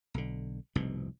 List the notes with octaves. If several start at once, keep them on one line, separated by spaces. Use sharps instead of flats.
B1 D3
F1 C2 G#2 B2